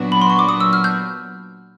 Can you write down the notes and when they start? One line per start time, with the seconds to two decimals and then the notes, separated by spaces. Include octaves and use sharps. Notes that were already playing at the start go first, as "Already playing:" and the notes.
Already playing: A#2 F#3 B3 D4 F#4
0.12 B5
0.22 C6
0.30 C#6
0.39 D6
0.49 D#6
0.61 E6
0.73 F6
0.84 G6